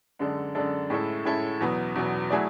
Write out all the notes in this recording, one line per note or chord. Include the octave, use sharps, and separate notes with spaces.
F#2 D3 G#3 D4 A4
F#2 D3 G#3 D4 A4
A2 G#3 C#4 E4 A4
A2 G#3 C#4 E4 A4
E2 B2 F#3 B3
E2 B2 F#3 B3
F#3 A3 E4 G#4 D5